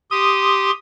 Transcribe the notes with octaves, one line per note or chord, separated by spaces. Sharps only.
G4 C6 D#6